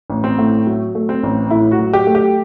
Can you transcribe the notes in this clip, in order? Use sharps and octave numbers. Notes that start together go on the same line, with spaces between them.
A1
C4
A2
F#3
A3
C4
A1
A2 E4
F#4
F#3
G4
A3
G4